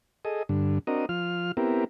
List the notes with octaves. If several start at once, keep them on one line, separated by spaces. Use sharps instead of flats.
G#4 A4 D#5
G2 D3
C4 D4 F#4 A#4 D#5
F3 F4 F6
B3 C4 E4 G4 A#4